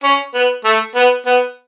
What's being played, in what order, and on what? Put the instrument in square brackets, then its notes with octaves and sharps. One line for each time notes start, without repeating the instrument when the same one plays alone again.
[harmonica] C#4
B3
A3
B3
B3